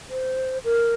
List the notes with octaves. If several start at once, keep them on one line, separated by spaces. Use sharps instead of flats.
C5
A#4